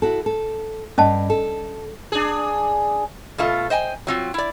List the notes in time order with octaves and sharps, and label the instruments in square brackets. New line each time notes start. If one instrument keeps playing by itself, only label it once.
[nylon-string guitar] E4 F#4 A4
A4
[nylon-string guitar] G2 [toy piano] C#4 D#5 A5
[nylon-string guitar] A4
[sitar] D4 G#4
[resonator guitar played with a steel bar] B2 A3 F4 A4
C5 D#5 G5 G#5
F#3 C4 F4
E4 D5